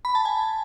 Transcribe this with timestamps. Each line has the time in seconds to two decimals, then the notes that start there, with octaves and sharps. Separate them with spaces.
0.05 B5
0.15 A5
0.25 G#5